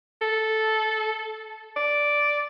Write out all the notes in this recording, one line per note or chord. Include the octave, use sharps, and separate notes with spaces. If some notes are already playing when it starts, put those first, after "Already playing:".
A4
D5